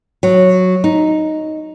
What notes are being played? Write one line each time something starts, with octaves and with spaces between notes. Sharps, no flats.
F#3
D#4